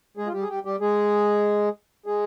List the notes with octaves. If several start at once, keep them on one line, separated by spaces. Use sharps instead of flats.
G#3 G#4
F4
G3 G4
G#4
G3 G4
G3 G4
G#3 G#4
G#3 G#4